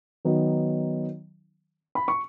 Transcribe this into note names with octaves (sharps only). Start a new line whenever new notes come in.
D#3 F#3 B3 D#4
B5
C#6